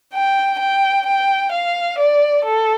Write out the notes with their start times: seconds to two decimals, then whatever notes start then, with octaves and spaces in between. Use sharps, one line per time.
0.14 G5
0.60 G5
1.06 G5
1.52 F5
1.99 D5
2.45 A4